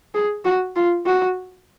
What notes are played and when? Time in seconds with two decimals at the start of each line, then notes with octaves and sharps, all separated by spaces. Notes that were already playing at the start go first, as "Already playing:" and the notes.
0.14 G#4
0.45 F#4
0.76 F4
1.06 F#4